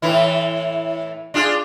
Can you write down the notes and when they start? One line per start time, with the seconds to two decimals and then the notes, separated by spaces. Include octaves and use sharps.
0.02 A2 E3 E4
1.34 D4 F4 G#4